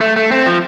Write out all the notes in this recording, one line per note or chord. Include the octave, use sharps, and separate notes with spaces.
A3
A3
C4
F3